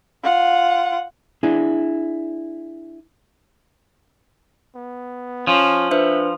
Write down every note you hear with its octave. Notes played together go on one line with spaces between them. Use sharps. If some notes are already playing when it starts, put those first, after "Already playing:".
F4 F#5
D4 E4 G#4
B3
F3 C#4
D4 B4 C5 E5